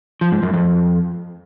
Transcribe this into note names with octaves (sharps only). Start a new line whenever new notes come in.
F3
G#2
F#2
F2